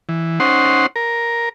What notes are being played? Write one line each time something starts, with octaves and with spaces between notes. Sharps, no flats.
E3
C#4 D#4 C5 F#5 C6
A#4